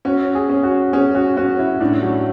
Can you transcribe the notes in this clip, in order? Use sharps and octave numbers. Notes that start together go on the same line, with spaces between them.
C#4 F#4
G#4
C#4
F#4
C#4 G#4
F#4
C#4 F#4
E4
A2 D4
F#3